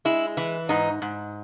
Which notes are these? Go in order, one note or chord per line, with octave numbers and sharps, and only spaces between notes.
G#3 E4
E3
G#2 D#4
G#2